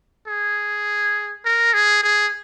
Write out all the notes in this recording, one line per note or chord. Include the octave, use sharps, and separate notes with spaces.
G#4
A#4
G#4
G#4